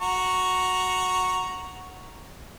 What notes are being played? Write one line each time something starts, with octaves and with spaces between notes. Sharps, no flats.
F#4 A#5 C#6